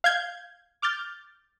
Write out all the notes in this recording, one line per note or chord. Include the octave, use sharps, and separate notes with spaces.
F5 G6 G#6
D6 F6 G6 A6